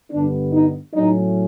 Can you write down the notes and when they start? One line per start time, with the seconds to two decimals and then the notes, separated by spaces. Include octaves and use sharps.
0.11 G2 D3 G3 B3 D4
0.53 D#4
0.94 A2 F#3 A3 C#4 D#4